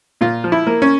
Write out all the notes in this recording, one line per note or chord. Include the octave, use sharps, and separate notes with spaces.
A#2 F4
F3
E4
A#3
C#4